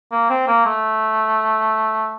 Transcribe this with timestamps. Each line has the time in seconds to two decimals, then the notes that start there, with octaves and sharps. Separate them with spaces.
0.12 A#3
0.30 C4
0.47 A#3
0.66 A3